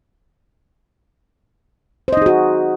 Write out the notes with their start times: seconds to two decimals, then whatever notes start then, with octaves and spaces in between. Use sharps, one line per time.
2.08 C5
2.13 D#5
2.17 D#4
2.22 G#4
2.26 F#4